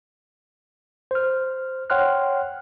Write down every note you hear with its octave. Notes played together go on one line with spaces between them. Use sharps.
C5 F6
C#5 F#5 G5 C6 F6 F#6